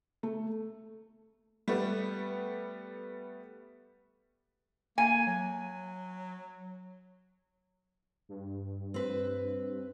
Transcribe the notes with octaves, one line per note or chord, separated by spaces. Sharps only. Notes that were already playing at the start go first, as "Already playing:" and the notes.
A3
G3 A3 B3
A#3 G#5
F#3
G2
C4 B4